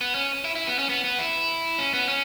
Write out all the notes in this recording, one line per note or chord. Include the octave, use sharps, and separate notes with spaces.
B3
C#4
E4
E4
B3
C#4
B3
B3
E4
C#4
B3
C#4